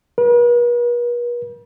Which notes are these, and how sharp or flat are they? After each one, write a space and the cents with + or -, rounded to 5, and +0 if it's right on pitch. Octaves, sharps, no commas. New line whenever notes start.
B4 -45